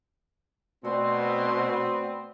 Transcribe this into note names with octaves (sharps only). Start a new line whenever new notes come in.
B2 A3 B3 C4 F#4 D5 C6